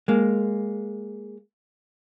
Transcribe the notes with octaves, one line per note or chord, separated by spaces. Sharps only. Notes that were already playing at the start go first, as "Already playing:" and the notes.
G#3 A#3